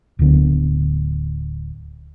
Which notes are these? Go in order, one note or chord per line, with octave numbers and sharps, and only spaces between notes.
D1 D2 D3 B3